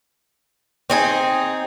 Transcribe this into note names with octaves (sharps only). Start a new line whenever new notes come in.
C4 D#4 G#4